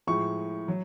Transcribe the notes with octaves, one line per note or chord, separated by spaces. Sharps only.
A2 F3 G#3 C#6
F#3